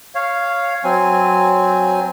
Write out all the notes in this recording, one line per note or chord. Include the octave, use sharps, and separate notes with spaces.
C#5 F5
F#3 C4 G#5